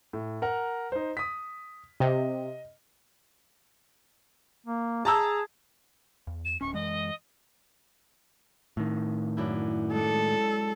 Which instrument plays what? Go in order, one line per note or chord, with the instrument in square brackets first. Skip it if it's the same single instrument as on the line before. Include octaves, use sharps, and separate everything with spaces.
[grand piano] A2
A#4 F#5 A#5
D#4 C5
D#6 B6
[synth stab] C3 [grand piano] D#5
[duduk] A#3
[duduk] G#4 [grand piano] A5 A#5 E6
[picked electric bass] E2
[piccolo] E7
[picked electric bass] D1 C#4 [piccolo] C#6
[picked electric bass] F#2 E3 G#3 [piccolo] D#5
[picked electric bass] A2 D#3
[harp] F#2 D4 E4
[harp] G#3 D4 C#7 [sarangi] A4